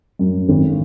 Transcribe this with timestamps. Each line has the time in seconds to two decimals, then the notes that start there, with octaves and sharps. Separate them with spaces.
0.19 F#2
0.49 G#1